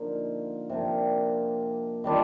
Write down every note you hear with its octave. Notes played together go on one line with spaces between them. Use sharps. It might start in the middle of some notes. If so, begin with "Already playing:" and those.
Already playing: D3 F3 A#3 D#4
C3 F3 A#3 D4
D#3 G3 D4 F4